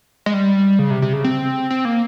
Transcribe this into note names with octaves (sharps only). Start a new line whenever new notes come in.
G#3
G3
C#3
C3
C3
C#3
C4
C4
A#3